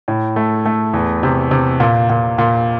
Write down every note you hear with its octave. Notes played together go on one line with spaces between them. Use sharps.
A2
A3
A3
E2
C3
C3
A#2
A#2
A#2